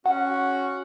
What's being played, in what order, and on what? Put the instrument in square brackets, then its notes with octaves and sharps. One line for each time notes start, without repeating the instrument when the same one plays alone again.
[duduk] C#4 [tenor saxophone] F#4 [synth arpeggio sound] F#5